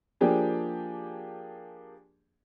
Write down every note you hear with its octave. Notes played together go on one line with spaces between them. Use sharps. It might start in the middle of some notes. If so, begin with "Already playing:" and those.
F3 A#3 D4 G4 G#4